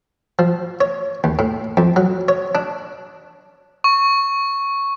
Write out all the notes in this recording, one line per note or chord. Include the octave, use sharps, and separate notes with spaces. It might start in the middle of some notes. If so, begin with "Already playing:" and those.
F3
C#5
D#2
A2
F2
F#3
C#5
D4
C#6